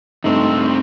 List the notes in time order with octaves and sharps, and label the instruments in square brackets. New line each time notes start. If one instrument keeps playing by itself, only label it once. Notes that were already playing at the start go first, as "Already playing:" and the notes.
[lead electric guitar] C#2 C4 [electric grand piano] G2 A3 D#4